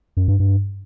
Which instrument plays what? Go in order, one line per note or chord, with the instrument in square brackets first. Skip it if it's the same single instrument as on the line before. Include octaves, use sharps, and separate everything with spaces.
[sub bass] F#2
G2
G2